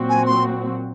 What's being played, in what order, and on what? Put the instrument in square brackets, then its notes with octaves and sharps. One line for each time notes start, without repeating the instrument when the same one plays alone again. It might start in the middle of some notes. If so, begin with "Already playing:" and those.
Already playing: [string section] A#2 F#3 C4 F#4
[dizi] G#5
C6